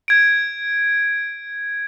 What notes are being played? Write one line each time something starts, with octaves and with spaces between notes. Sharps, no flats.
G#6 D7